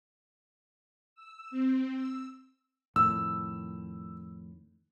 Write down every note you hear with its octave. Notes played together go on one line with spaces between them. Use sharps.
E6
C4
E6
F2 A2 D#3 E6